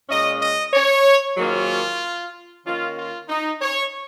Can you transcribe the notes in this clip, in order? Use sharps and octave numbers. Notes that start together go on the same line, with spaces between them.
A#2 G#3 C#4 D#5
D#5
C#5
G#2 D#3 F#3 A#3 C#4 F4
D#3 A#3 C#4 F4
F4
D#4
C#5